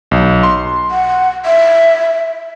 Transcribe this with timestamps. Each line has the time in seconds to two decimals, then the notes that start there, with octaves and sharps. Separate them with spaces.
0.11 B1
0.43 C6
0.91 F#5
1.46 E5